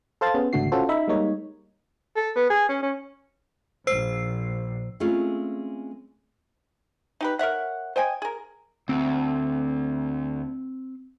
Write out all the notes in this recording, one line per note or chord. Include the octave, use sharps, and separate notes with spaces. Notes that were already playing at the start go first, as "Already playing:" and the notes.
A4 C5 F5 A5 A6
B3 C#4 G#4
G#1 C#2 D3 A3 F#4 C7
C#4 F4 F#4 A4 C5
D#4 E5 B5
G3 G#3 A#3 D#4 C#5
A4
B3
G#4
C#4
C#4
A#1 C5 E6 C7
G#3 A3 C4 C#4 F4
D#4 G4 B4
A#4 C#5 E5 F#5
C5 D#5 G5 G#5
G#4 A#4
D2 C4